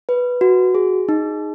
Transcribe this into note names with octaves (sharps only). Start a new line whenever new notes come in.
B4
F#4
G#4
D#4